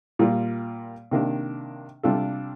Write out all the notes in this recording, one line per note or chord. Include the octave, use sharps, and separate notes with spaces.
A#2 G3 A#3 F4
C3 D#3 A#3 D4
C3 G3 D4 F4 A4